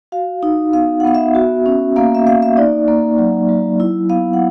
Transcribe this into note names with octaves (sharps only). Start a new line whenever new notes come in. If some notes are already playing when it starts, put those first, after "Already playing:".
F#4 F5
D#4
B3 F5
F#5
B3 F5
E5
F#4
C#4
A#3 F5
E5
A#3 F5
E5
D#4 D5
A#3
F#3
F#3
E4
B3 F5
F#5